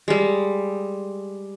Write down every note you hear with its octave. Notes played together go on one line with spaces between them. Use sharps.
G3 G#3